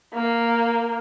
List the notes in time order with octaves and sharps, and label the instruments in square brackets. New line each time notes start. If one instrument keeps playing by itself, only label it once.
[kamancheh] A#3